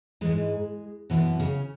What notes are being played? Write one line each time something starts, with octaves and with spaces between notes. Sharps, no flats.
G#2 E3 G#3
F#2 B2 E3 B3
C#3 C#4